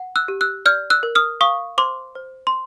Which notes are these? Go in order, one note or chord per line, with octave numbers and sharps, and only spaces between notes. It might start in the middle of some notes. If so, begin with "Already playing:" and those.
Already playing: F#5
E6 F#6
G4
E6 F#6
D5 F6 G6
E6 F#6
A#4
D#6 F6
F5 C#6 D#6
C5 C6 D6
C5
C6